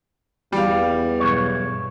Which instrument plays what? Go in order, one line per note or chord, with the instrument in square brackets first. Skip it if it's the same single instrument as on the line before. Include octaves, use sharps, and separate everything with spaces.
[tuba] E2 [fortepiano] G3 F5
[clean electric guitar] B1 G2 C#5